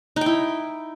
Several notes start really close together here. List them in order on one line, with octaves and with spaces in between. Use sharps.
D#4 G5 E4